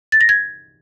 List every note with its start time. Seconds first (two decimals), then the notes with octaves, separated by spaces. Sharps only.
0.12 A6
0.21 A#6
0.29 G#6